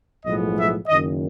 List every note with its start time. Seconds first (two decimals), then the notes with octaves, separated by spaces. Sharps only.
0.24 B1 A2 F3 G#3 B3 D#5
0.57 E5
0.88 F#1 F#2 D#3 D#5